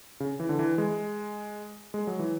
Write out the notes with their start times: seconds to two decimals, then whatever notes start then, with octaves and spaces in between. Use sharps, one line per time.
0.20 C#3
0.40 E3
0.49 D3
0.59 E3
0.78 G#3
1.94 G#3
2.07 F#3
2.19 E3